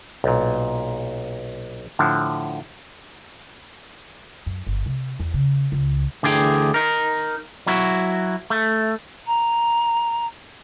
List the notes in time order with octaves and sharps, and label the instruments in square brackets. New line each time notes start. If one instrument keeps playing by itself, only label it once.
[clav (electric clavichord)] B1 A#2
A2 D3 F3
[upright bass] F#2
G1
C3
E2
C#3
C#2
[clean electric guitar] D2 D3 E3 G#4 G5
D#4 A#4
F#3 E4 F#4
A3
[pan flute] A#5